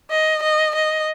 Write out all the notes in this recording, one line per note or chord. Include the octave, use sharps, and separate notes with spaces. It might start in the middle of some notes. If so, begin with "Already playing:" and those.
D#5
D#5
D#5